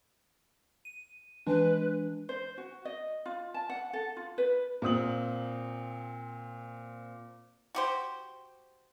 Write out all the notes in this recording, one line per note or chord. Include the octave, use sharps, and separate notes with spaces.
D#7
E3 G#3 D4 B4
C5
F#4
D#5
F4
A5
F#5
A4
F4
B4
A#2 C4 D#6 F#7
F#4 G4 C5